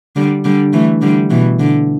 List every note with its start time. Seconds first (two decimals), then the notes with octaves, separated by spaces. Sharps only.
0.16 D3 G3
0.44 D3 G3
0.73 E3 A3
1.02 D3 G3
1.30 B2 E3
1.59 D3